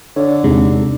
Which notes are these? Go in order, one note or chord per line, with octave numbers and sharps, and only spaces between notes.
D3 C#5 D5
E2 C3 G#3 D#4